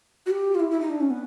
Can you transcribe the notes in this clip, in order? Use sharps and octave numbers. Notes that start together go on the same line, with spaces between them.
F#4
G4
F4
E4
E4
D#4
D4
C#4
B3